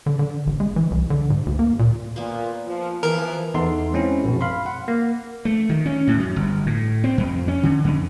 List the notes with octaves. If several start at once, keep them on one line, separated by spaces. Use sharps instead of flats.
D3
D3
A1
G#3
E3
C2
D3
G#2
D2
A#3
A#2
A#2 A#3 B3
F3
E3 F3 B3 E4 A#4 B4
E2 D#4 A4 C6
G#3 C4 C#4 E4
A#1 F#2 B2
F5 B5 C6
F#5
A#3
A3
D#3
C#4
A2
F#2
G1
A2
C4
F2
C#4
D3
F2